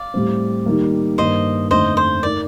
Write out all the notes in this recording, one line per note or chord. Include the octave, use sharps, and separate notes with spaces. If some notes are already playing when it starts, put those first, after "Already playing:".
Already playing: D5 F5
A2 G3 C4
D#3 G3 A#3
G2 D#3 A#3 C5 D#5
F2 D3 A3 D#4 C5 D#5
C5
A3 D#4 A#4 D5